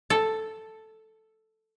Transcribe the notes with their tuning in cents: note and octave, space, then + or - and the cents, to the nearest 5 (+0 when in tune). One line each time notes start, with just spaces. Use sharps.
A4 +0